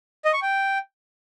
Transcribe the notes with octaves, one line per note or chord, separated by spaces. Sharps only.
D#5
C#6
G5